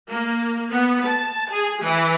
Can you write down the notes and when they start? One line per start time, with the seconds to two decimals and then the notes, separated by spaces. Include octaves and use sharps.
0.10 A#3
0.72 B3
1.06 A5
1.51 G#4
1.82 E3